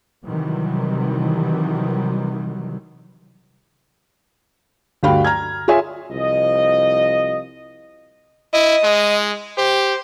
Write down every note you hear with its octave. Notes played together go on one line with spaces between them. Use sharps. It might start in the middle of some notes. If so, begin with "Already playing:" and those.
C3 D#3 E3 F#3 G3
D2 G2 F#4 F5 G5 B5
A#5 F6 G#6
F4 G#4 C#5 E5 G#5
C2 F3 D#5
E4 D#5
G#3
G4 C5